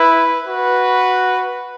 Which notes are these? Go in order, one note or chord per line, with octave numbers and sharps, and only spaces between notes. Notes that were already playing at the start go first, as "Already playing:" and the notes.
Already playing: E4 B4
F#4 B4